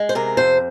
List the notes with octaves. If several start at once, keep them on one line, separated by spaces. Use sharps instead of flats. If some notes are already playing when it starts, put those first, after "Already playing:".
Already playing: G#3
C5
C3 A#4
F2 C5